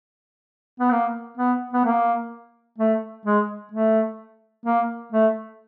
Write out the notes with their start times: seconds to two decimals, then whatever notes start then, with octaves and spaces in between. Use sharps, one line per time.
0.80 B3
0.91 A#3
1.38 B3
1.73 B3
1.85 A#3
2.79 A3
3.26 G#3
3.72 A3
4.66 A#3
5.12 A3